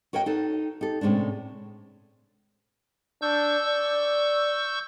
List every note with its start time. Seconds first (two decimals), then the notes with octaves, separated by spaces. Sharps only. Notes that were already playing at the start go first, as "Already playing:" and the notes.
0.13 F#4 A#4 C#5 D#5 G5
0.26 D#4 F#4 A4
0.81 D#4 G4 A4
1.01 A2 C3 G#3 C#4 D4
3.22 D4 C#6 E6 G6
3.66 D5